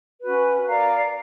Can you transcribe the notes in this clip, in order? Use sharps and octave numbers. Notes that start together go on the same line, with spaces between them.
C#4 F#4 B4
A#4 D5 F5 A#5